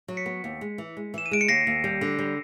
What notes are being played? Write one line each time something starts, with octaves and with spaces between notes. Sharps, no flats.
F#3
B6 C#7
B3
D#2
G#3
E3
G#3
E3 E7
D#7
G#3 D7
C#7
D#2 A#6 C7
D#2
G3
D3
G3